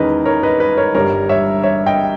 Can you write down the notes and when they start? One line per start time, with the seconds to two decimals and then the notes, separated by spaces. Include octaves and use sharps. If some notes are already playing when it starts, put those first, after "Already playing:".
Already playing: E2 D#3 G#3 C#4 A#4 B4 D#5
0.25 A#4 C#5
0.43 B4 D#5
0.60 B4 D#5
0.77 A#4 C#5
0.95 G1 G2 G3 A#4 C#5
1.29 C#5 E5
1.63 C#5 E5
1.86 D#5 G5